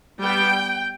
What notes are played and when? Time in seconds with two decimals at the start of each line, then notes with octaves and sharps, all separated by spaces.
0.22 G3 B3 G5